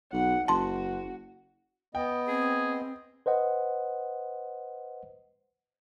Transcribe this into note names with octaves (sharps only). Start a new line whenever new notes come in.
B1 F#5
F#1 F#4 A5 C6
B3 D#5 G5
C4 G#4
B4 C5 D#5 F#5